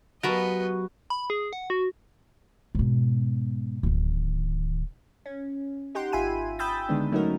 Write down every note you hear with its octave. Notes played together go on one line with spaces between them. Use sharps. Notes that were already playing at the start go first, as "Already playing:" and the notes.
F#3 B3 F#4 G4 A#4 B4 D#5 A5
B5
G#4
F#5
F#4
G#2 B2
D1 D#3
C#4
D#4 G4 F#5 G5 C6
G#1 F4 E5 G#5 B5 D#7
G5 B5 D#6 E6 G6 A6
D3 D#3 G#3 B3 D4
F#3 A3 C#4 D#4 F#4 A#4